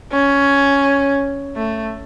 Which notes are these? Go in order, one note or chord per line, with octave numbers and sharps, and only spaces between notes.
C#4
A3